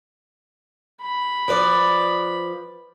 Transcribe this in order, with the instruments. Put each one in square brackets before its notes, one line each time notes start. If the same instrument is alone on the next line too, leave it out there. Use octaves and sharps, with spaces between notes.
[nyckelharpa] B5
[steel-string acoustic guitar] F3 B4 D5